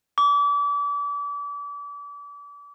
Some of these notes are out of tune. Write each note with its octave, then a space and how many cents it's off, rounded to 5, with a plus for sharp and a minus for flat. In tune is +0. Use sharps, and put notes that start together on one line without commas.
D6 -35